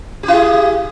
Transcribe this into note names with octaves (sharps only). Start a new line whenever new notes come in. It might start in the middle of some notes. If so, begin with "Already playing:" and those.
E4 G4 G#4